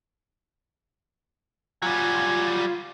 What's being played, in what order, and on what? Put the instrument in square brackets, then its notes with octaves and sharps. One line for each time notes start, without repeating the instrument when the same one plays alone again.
[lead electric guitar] F#3 G3 [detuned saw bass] F4 [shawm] G#5